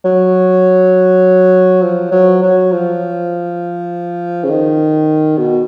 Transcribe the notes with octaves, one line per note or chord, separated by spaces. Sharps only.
F#3
F3
F#3
F#3
F3
C#3
D#3
B2